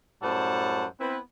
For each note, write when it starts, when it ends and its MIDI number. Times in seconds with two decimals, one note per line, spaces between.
0.22 0.85 42
0.22 0.85 45
0.22 0.85 55
0.22 0.85 72
0.22 0.85 78
0.22 0.85 81
1.00 1.18 59
1.00 1.18 60
1.00 1.18 64
1.00 1.18 71